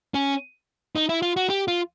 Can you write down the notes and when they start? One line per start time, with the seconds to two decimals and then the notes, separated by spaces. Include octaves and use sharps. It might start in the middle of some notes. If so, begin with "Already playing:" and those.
0.14 C#4
0.96 D#4
1.09 E4
1.22 F4
1.37 F#4
1.50 G4
1.68 F4